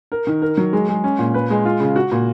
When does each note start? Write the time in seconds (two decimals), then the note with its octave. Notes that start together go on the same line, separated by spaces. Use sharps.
0.12 A#4
0.27 D#3
0.42 A#4
0.57 F#3
0.73 G#3
0.89 G#3
1.04 C#4
1.19 A#2
1.34 B4
1.50 G#3
1.65 F4
1.80 C#3
1.96 F#4
2.12 A#2